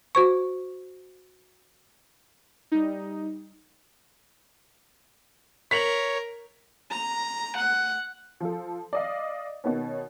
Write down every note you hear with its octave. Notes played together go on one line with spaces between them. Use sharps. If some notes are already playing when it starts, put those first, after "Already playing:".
F#4 C5 C#6
G3 D#4
A#4 C#5 B6 F7 F#7
A#5
F#5
F3 F4 A4
D5 D#5 F5
B2 D#3 B3 C#4